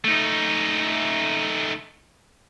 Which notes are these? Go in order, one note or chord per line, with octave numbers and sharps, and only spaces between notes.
A3 D#4